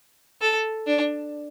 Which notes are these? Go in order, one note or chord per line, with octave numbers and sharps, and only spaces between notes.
A4
D4